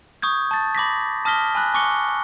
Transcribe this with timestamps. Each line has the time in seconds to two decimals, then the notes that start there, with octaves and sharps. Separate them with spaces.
0.22 C#6 D#6 G6 G#6
0.51 A5 A6
0.75 B5 D6 A#6 B6
1.25 A5 D#6 F6 A#6 B6 G7
1.55 G#5 B5 F#6
1.74 G#5 C#6 D6 F#6 C#7 G7